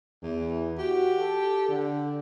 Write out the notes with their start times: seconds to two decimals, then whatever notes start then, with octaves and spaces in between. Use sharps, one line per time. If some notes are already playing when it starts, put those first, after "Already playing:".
0.23 E2 E3
0.78 F#4 G4
1.19 A4
1.69 D3